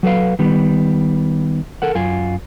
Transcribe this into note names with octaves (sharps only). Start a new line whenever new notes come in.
F#3 A4 B4 F5
D#3 G3 B3
A4 A#4 F#5
F#2 F4 G#5